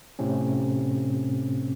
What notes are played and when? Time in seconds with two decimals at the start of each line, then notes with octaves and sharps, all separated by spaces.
0.19 A2 C3 C4 C#4